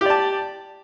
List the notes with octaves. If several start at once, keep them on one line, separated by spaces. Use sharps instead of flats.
G4 D5 A5